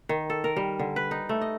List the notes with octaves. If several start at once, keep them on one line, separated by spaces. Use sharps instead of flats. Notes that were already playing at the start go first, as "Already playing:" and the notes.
D#3
A4
A#4
G3
D3
B4
D#4
A3
D#5